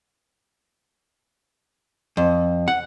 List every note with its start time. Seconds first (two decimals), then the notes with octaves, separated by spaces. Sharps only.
2.17 F2
2.68 F#5